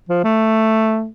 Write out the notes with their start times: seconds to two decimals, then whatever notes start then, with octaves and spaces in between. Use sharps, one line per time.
0.09 F3
0.24 A3